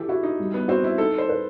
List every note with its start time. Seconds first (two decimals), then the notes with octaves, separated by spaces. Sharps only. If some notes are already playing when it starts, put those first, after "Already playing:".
Already playing: E3 G4 A4
0.09 E4 F#4
0.23 D#4
0.39 G3
0.54 B3
0.68 C4 F#4
0.84 E4
0.98 D#4 A4
1.18 C5
1.29 B4